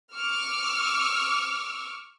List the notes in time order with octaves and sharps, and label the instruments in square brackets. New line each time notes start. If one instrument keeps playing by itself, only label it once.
[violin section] C#6 D6 E6 F6